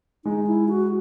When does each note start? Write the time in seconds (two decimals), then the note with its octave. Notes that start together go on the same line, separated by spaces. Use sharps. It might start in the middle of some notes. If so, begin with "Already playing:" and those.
0.25 G#3 D#4
0.47 E4
0.68 F#4